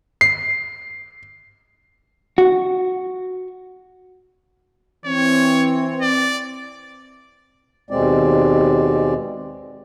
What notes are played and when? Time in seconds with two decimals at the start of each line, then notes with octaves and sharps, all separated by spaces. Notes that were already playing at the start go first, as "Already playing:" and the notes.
0.21 C7
2.38 F#4
5.06 E3 C4 C#5
6.02 D5
7.90 D#2 B2 G#3 C4 D5